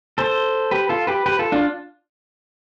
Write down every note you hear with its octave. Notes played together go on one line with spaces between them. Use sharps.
A4 C5
G4 B4
F4 A4
G4 B4
G4 B4
F4 A4
D4 F4